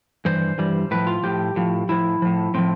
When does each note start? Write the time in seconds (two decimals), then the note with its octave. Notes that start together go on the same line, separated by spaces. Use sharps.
0.25 G2 E3 C5
0.58 G2 E3 G3
0.91 A2 F3 B4
1.07 F4
1.24 A2 F3 G4
1.56 A2 F3
1.89 A2 F3 E4
2.22 A2 F3
2.54 A2 F3 C4